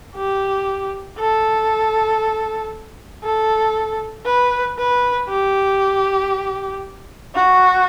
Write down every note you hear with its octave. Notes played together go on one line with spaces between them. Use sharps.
G4
A4
A4
B4
B4
G4
F#4